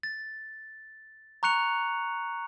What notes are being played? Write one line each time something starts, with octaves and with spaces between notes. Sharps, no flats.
A6
A#5 C#6 F#6 C#7 F7